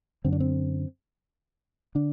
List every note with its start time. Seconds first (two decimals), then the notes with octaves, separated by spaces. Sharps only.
0.25 F#2 D3 C4
0.33 D4
0.40 C4
1.95 D3 D4